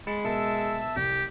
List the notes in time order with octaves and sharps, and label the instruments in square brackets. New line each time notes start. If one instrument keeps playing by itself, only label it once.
[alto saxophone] G#3 [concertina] B5 [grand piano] A6 C#7 E7
[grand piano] B2 A#4 C#7 [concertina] E5 A5 E6
[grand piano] C2 [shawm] G4